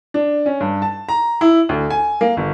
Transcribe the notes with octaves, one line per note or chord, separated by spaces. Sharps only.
D4
C#4
G2
A5
A#5
E4
D2
G#5
A#3
G1